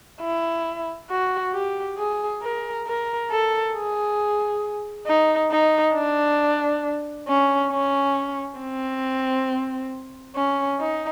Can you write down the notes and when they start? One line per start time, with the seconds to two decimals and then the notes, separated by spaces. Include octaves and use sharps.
0.21 E4
1.10 F#4
1.53 G4
1.97 G#4
2.42 A#4
2.87 A#4
3.31 A4
3.74 G#4
5.07 D#4
5.51 D#4
5.94 D4
7.28 C#4
7.71 C#4
8.59 C4
10.36 C#4
10.80 D#4